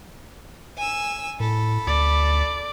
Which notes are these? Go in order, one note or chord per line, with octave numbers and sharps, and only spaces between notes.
G#5 E6
A2 A4 B5
D2 D5